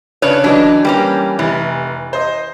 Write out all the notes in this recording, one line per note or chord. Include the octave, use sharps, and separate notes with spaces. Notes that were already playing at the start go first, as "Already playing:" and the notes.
C#3 D4 B4 C#5
E3 F#3 D4 D#4
E3 G3 A#3 C#4
F1 E3
C5 D#5